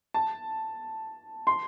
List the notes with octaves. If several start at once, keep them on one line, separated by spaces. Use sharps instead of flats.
A5
C6